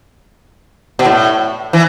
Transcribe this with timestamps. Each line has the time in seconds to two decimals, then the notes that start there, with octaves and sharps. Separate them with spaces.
0.99 B2
1.05 A2
1.73 E3